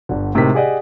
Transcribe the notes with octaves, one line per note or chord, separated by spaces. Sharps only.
G1 D3
A2 C3 G#3 D#4 A#4 B6
G4 G#4 D5 D#5 F#5